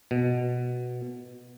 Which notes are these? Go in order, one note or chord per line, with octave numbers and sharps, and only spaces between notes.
B2